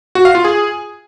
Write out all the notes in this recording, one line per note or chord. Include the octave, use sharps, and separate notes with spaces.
F#4
F5
F4
G#4